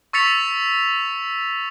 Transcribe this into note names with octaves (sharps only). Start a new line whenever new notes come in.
C#6 E6 A6 B6 C#7 F7